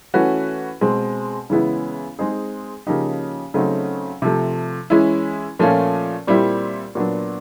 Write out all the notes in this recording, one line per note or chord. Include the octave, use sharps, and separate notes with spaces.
E3 A3 C#4 F#4 B4
B2 G#3 C4
C#3 E3 G#3 B3 E4
G#3 C4 D#4 G#4
C#3 F3 A#3 D#4 G4
C#3 F#3 A3 C4 D#4
C3 F3 A3
E3 G#3 C#4 E4
A#2 F3 A3 C#4 F4
A#2 G3 C4 E4 G4
A#2 F#3 B3 D4